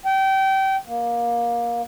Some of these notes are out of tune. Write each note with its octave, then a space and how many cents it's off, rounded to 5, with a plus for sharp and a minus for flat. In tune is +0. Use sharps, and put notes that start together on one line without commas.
G5 -25
A#3 +20